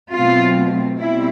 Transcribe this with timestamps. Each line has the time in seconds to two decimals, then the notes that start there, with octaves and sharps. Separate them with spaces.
0.14 B2 F#3 A3 C4 F4
0.99 B2 G3 C4 E4